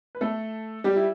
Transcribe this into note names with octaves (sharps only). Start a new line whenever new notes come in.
B4
A3 A4
G3 G4
E4